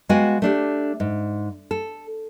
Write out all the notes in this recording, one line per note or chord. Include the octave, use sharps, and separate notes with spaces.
G#3 B3 F#4 F5 G5 G#5
A3 D4 G4
G#2
A4